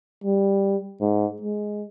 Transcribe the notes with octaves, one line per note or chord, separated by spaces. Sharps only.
G3
G#2
G#3